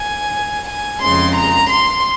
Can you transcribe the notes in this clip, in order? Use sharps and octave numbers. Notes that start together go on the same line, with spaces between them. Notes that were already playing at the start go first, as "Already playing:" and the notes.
Already playing: G#5
G#5
F2 C#3 G#3 C6
A#5
C6